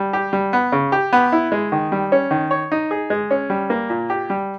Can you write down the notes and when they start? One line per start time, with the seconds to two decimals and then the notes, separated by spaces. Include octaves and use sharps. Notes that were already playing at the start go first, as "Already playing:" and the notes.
Already playing: G3
0.13 G4
0.33 G3
0.53 B3
0.72 C#3
0.92 G4
1.13 B3
1.32 E4
1.52 G#3
1.72 D#3
1.92 G3
2.12 C#4
2.31 D#3
2.51 C#5
2.72 D#4
2.91 G#4
3.10 G#3
3.31 C#4
3.50 G3
3.70 A#3
3.90 A#2
4.10 G4
4.30 G3